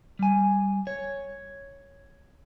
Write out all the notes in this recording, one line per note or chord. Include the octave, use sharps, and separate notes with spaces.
G3 G#5
C#5